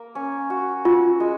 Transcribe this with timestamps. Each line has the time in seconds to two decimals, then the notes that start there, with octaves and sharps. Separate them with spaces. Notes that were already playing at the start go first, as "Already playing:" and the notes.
Already playing: A#3
0.15 C#4
0.50 F#4
0.85 F4 F#4
1.20 G#3